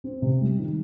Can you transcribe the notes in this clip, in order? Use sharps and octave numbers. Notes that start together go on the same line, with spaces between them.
C4
C3
G3
D#3